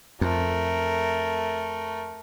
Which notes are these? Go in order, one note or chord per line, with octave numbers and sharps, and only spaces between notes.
F2 A3 A#4